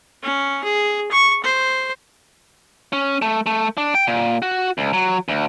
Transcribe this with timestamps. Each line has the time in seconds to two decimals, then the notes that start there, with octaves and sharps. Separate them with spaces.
0.22 C#4
0.64 G#4
1.11 C#6
1.43 C5
2.93 C#4
3.22 A3
3.46 A3
3.77 D4
3.95 G5
4.07 A#2
4.42 F#4
4.78 C#2
4.93 F#3
5.29 D2